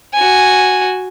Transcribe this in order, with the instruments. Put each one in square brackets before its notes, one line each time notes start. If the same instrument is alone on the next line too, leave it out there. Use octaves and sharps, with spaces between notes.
[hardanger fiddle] F#4 G#5